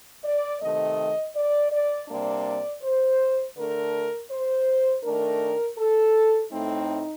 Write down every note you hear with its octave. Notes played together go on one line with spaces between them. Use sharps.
D5
C3 D#3 A3 D#5
D5
D5
C3 G3 A#3 D4 D5
C5
D3 A3 D4 A#4
C5
D#3 A3 D4 A#4
A4
A2 A3 C4 D#4